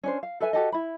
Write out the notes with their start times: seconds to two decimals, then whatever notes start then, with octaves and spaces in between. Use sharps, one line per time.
0.04 C#4 D4 C5
0.23 F5
0.40 A4 B4 E5 G#5
0.53 F#4 G4 A4 D#5
0.72 E4 B5